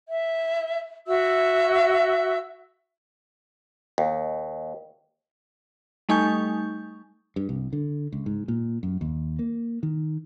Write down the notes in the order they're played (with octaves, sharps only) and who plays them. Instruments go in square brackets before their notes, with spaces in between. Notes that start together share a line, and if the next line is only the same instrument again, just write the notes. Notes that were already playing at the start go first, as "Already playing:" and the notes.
[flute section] E5
F#4 E5 E6
[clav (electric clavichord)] D#2
[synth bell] G3 A3 D#4 G#5 C#6 G6
[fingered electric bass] G2
C2
D3
C#2
G#2
A#2
F#2
D#2
A#3
D#3